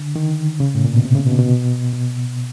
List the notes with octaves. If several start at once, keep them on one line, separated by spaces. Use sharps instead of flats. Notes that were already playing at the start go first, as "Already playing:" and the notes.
Already playing: D3
D#3
C#3
A2
A#2
B2
C3
C#3
B2
B2
B2